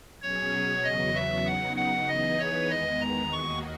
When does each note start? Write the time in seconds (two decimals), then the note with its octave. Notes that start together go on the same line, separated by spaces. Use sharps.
0.22 B2 F#3 C#4 G#4 C#5
0.84 E2 C#3 F#3 B3 F#4 D#5
1.15 E5
1.45 C#3 F#3 B3 D#4 F#5
1.76 F#5
2.08 E3 B3 D#4 G#4 B4 D#5
2.39 C#5
2.70 E2 D#3 G#3 B3 D#5
3.01 A#5
3.32 D#2 D#3 A#3 D#4 F#4 C#6